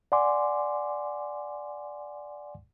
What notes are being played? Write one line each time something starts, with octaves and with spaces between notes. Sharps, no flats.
D5 F#5 G#5 C6 D6